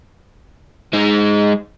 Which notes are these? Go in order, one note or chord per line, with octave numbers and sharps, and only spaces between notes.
G#3 D#4